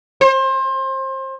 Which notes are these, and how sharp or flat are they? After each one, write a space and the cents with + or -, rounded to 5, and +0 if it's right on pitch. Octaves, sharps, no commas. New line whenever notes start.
C5 +30